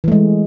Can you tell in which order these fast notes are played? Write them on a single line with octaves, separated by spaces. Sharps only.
E3 A3 G#3